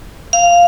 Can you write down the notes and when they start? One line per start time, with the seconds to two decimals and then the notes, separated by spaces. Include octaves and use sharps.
0.33 F5